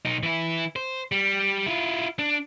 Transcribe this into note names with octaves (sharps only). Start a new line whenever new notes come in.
B1 D#4
E3 E4
C5
G3
E4 F4
D4